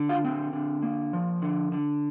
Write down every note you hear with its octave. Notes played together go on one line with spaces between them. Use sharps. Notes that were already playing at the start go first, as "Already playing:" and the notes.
Already playing: D3
F4 F5
C4
D3
A#3
F3
D3
D3